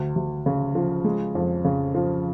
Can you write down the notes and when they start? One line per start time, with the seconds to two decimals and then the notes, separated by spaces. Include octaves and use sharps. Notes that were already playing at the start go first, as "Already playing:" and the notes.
Already playing: D2
0.16 D2
0.46 C#3
0.75 F3
1.04 G#3
1.35 F2
1.65 C#3
1.95 F3